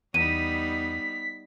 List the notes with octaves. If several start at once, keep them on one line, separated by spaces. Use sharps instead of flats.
E2 G3 B3 D#4 B6 D#7